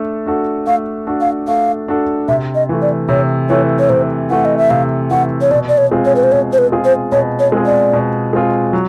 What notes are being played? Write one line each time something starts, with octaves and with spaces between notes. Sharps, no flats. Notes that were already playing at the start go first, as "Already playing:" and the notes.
Already playing: A3 D4 A4
D4 F#4 A4
A3 F5
D4 F#4 A4
F5
A3 F5
D4 F#4 A4
C3 E5
D#5
E3 A3
D5
C3 C#5
E3 A3 C#5
C#5
C3 C5
E3 A3 F#5
D#5
E5
C3 F5
E3 A3 F#5
C#5
B2 D5
D5
C#5
G#3 C4 F4 G#4
C#5
B4
C5
B2 C#5
C5
B4
G#3 C4 F4 G#4
C5
B2 C#5
C#5
G#3 C4 F4 G#4
D5
B2
G#3 C4 F4 G#4
F#3